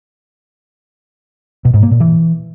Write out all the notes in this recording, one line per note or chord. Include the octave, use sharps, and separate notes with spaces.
B2
G#2
A#3
A#2
E3